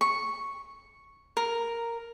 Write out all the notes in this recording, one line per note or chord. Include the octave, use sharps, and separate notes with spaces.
C#6
A#4